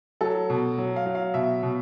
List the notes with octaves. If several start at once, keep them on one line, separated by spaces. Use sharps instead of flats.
F#3 A4
B2
F#3
F5
F#3
F5
B2 E5
B2